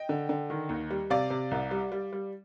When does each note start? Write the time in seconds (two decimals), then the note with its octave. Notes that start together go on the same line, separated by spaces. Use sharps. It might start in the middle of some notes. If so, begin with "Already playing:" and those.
Already playing: D#5 G5
0.09 D3
0.29 D3
0.50 D#3
0.69 D#2
0.91 G3
1.10 C3 D5 F5
1.30 C3
1.51 C2
1.71 G3
1.92 G3
2.13 G3